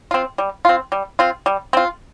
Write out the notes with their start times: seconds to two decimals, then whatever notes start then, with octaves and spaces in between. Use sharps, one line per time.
0.11 C4 F4
0.38 G3
0.65 C4 F4
0.92 G3
1.19 C4 F4
1.46 G3
1.73 C4 F4